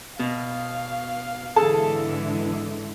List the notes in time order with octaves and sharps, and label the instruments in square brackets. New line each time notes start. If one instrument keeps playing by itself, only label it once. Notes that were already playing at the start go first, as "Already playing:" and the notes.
[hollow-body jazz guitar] B2 [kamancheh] F5
[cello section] G#2 D3 E3 [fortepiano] G#4 A4 A5